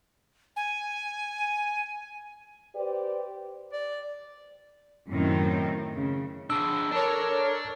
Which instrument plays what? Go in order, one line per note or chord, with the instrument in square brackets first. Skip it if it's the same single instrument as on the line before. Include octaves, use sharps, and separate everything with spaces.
[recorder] G#5
[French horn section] G4 B4 C5 D5
[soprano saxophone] D5
[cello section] F#2 A2 D#3 C4
C#3
[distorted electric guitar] D4 G#4 [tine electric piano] E6
[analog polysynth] A4 A#4 C#5 [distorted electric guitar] D5 A5